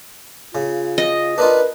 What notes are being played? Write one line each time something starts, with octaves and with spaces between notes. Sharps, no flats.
C#3 F4
D#5
D4 D#4 F4 A#4 B4